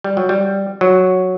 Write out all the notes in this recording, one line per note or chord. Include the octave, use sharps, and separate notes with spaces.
G3
F#3
G3
F#3